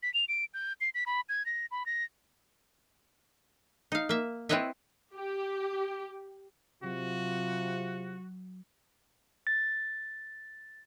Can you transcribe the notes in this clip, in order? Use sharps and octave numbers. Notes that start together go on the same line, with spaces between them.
B6
F7
D7
G6
C7
B6
B5
G#6
A#6
B5
A#6
D#4 F5
A#3 E5
C4 E4 B4 C#5 D#5 E5
G4
C3 F#3 F4 F#4
A6